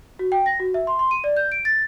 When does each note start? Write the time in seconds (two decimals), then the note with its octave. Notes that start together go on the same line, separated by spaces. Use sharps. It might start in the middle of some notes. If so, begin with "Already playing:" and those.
0.19 F#4
0.32 G5
0.46 A#6
0.60 F#4
0.74 E5
0.87 C6
0.99 C6
1.11 D#7
1.24 D5
1.37 G6
1.52 D7
1.65 A6